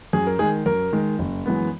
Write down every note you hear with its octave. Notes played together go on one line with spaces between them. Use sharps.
F#2 G#4
A#4
D#3 G#3 G#4
F#2 A#4
D#3 G#3
F#1
F#2 E3 G#3 B3